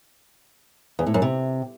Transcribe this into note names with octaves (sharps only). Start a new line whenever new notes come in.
E2
A2
F#2
C3